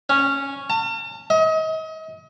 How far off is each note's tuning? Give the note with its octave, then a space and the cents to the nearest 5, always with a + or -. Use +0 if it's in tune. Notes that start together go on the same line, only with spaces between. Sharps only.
C#4 -5
A5 +40
D#5 +35